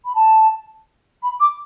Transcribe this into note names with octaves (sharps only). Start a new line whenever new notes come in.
B5
A5
B5
D6